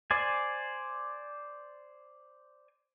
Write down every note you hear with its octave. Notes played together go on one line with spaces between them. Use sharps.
C5 D5 G#5